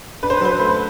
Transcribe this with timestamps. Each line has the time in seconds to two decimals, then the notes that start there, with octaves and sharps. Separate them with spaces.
0.23 D4 B4
0.30 C5
0.37 B4
0.41 F#3 C5
0.52 B4
0.60 A3 C5
0.68 B4